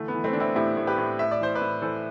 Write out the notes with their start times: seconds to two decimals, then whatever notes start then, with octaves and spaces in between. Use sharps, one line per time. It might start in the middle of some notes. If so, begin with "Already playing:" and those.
Already playing: D3 E3 A3
0.08 B3
0.14 E3
0.24 A3 C4
0.33 E3 D4
0.40 C4 E4
0.55 A2 E4 G4
0.77 A2
0.87 G4 B4
0.98 A2
1.19 A2 E5
1.31 D5
1.40 E3 C5
1.55 B4 D5
1.62 A2
1.82 E3 A4 C5